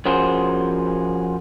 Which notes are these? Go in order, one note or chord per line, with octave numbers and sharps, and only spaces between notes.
F3 C#4 F#4 G#4 A#4 C5